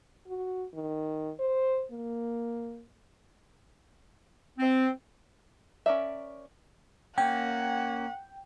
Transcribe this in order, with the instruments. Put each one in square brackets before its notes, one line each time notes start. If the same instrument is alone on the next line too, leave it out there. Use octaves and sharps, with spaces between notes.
[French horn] F#4
D#3
C5
A#3
[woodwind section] C4
[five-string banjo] C#4 A#4 D5 E5
[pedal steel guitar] A#3 C#4 [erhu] F#5 [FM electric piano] G5